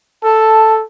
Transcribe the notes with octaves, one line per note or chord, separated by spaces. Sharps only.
A4 A5